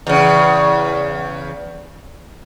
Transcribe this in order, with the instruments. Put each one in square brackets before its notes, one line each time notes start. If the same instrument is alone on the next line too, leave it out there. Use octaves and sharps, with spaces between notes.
[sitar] E2 C#3